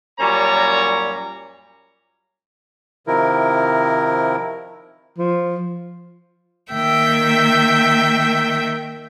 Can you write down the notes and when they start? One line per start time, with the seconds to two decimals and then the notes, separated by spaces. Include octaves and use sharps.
0.20 F#2 A#2 G3 C#5 A#5
3.07 C3 D#3 F3 E4 A#4
5.18 F3
6.73 D#3 A#3 E5 G5 G6